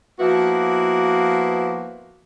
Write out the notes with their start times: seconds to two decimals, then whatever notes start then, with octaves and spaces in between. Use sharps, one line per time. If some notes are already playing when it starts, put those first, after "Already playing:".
0.20 F3 A#3 B3 E4 F#4